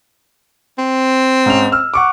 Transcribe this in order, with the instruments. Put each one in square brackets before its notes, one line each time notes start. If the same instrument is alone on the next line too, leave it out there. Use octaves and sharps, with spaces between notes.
[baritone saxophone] C4
[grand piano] G#2 C#4 F7
E6 F6
F#5 C#6 D6